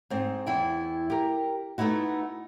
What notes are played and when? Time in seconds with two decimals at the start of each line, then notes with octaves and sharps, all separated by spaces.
0.10 G#2 C4
0.46 E2 E4 G5
1.10 G4 A#4
1.78 A3 B3 D#4 E4 F#4